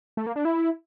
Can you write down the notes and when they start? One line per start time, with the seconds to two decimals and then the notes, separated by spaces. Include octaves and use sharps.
0.17 A3
0.26 A#3
0.36 D4
0.45 E4